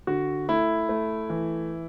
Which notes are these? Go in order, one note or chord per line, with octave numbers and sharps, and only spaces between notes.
D3 F#4
A3 E4
A3
E3